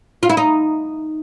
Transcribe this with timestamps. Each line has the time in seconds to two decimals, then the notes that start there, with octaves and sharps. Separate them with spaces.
0.23 F4
0.30 E4
0.37 D#4